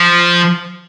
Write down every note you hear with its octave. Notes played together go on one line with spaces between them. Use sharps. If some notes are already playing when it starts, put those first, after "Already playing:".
Already playing: F3